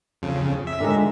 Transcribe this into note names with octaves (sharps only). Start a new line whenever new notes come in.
F2 C#3
E5
D3 D#3 G#3